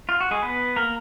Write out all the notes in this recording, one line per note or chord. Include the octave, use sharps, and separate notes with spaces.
F4
F#4
G#3 G#4
B3 B4
A#3 A#4